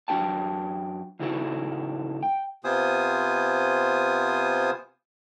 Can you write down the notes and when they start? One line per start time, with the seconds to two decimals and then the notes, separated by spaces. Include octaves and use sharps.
0.08 F#2 D4 F#4 G5 A5
1.20 A2 C#3 D#4 E4 F#4 A4
2.23 G5
2.64 C3 B3 F4 C5 G#5 D#6